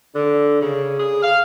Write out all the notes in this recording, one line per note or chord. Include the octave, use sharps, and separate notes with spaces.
D3
C#3
G#4
F5